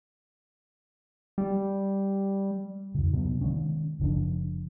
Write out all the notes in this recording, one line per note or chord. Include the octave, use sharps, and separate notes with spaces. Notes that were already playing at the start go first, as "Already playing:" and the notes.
G3
F2 C#3
C3 F#3 G3 B3
D#3 F#3 G#3 C#4
F#1 C#3 F3 D4